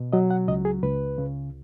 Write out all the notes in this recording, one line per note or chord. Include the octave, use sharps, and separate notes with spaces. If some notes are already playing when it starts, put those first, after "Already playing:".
Already playing: B2
F#3 D#5
F#5
C#2 D#5
G#4
C#2 B4
C#3